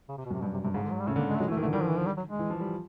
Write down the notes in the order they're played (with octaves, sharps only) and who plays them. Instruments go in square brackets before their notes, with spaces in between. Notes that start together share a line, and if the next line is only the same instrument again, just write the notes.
[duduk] C#3
C3
B2
[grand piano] F#2 [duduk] C3
[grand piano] G2 [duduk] B2
[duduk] C3
[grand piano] G2 [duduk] C3
[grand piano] G#2 [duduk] C#3
[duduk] D3
F#3
G3
[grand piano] C#3 [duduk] A3
[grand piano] D3
[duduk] A#3
G#3
A3
[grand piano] F#3 [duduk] G#3
[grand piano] E3
[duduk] A3
[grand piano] D#3
[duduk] A3
[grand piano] D3
[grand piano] D#3 [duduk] G3
[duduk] F3
E3
F3
G3
F#3
G#3
[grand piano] E3
F3
G3